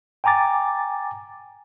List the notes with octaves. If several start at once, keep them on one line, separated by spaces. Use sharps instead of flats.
G5 G#5 A#5 D6 A6